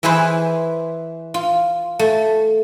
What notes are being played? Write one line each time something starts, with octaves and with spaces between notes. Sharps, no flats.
E3 E4 G#4 B4 C5 E5
F4
A3